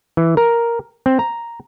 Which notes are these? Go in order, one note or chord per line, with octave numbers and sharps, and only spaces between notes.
E3
A#4
C4
A#5